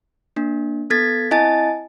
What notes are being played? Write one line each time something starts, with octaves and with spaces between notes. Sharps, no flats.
A#3 D4
B3 A4 G#6 A6 B6
C4 E4 D#5 G#5 A5 A6